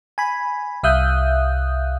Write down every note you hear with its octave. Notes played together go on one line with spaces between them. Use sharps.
G#5 B5
C2 E5 F5 D#6 F#6 G6